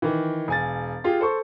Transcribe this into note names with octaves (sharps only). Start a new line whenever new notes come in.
D#3 E3
E1 G#5 A6
F4 G4 G#4
A4 C5 C#6